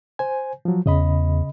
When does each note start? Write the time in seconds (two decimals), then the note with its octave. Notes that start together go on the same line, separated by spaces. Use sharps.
0.19 C5 G#5
0.65 F3 F#3
0.86 E2 C#3 D#5 B5